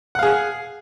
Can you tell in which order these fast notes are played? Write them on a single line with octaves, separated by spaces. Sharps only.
F#5 F5 G#4